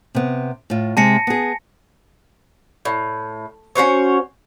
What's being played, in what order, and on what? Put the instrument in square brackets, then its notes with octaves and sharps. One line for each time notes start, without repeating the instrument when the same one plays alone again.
[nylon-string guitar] C3 B3
A2 F4
[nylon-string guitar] C3 G#3 [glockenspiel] A5 A#6 C#7
[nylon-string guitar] B3 G#4
[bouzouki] A2
C#4 F#4 C5 C#5